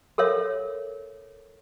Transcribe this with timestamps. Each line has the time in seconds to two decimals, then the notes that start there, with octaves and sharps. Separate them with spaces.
0.18 A4 A#4 C#5 E5